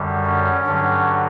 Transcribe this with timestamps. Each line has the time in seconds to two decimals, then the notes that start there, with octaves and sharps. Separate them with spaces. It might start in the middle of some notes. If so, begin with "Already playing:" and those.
Already playing: F#2 D3 G3
0.26 C#4
0.66 G2 D3 F#3 C#4